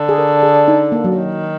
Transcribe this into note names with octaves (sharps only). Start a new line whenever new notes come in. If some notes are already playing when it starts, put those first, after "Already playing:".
Already playing: D3
G#4
A#4
G#4
D#4
A#3
F#3
D#3